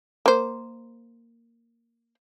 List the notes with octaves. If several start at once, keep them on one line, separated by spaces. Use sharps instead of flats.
A#3 C5